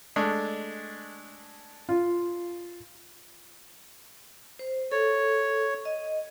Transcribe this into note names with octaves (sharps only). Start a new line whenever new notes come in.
G#3 A3 D4
F4
C5
A4 C#5
D#5